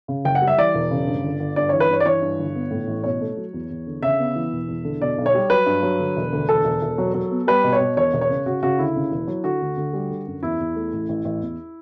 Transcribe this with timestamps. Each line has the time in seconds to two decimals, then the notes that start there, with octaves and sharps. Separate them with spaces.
0.08 C#3
0.24 F#1 G5
0.35 F#5
0.42 G3
0.47 E5
0.58 E3 D5
0.75 E1
0.91 C#3
1.07 G2
1.23 G1
1.40 G1
1.56 G2 D5
1.69 E3 C#5
1.80 B4
1.90 G2 C#5
2.00 D5
2.05 E3 C#5
2.21 G2
2.39 G1
2.55 B3
2.71 A2
2.87 A1
3.04 B2 C#5
3.21 A3
3.37 F#3
3.53 E2
3.70 E2
3.87 D3
4.03 C#3 E5
4.19 B3
4.35 E3
4.53 E1
4.68 E2
4.84 D3
5.01 B2 D5
5.18 B1
5.26 C#5
5.35 G3
5.50 F#3 B4
5.66 G2
5.83 F#3
5.99 D3
6.17 E1
6.33 D2
6.49 E1 A4
6.65 E1
6.82 E1
6.98 F#3
7.14 F#3
7.31 B3
7.47 G3 B4
7.64 B2
7.73 C#5
7.80 B2
7.97 E1 C#5
8.13 E1
8.21 C#5
8.29 C#3
8.46 C#3 F#4
8.63 C#3 F#4
8.79 D2 E4
8.95 C#3
9.11 E1
9.27 F#3
9.44 D3 F#4
9.61 D2
9.77 D2
9.93 G3
10.10 D3
10.27 F#2
10.43 E2 E4
10.59 E2
10.75 A3
10.93 A1
11.09 A1
11.25 A1
11.41 E2